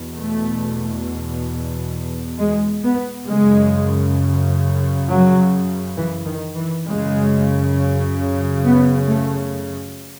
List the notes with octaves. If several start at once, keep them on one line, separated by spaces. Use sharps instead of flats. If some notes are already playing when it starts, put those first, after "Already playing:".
Already playing: E2 B2
A3
G#3
B3
F#2 C#3 G#3
F#3
E3
D#3
E3
F#2 C#3 G#3
B3
A3